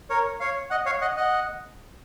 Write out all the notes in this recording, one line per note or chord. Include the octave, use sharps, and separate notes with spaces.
A#4 C#5
C#5 F5
D#5 F#5
C#5 F5
D#5 F#5
D#5 F#5